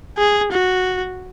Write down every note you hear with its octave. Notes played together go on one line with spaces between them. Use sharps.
G#4
F#4